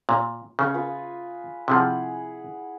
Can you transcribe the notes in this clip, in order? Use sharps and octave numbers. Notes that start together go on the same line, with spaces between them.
A#2
C#3 G#4 C#6 D#6
F4 B4 E5
C3 F3 E4 G#4 F#5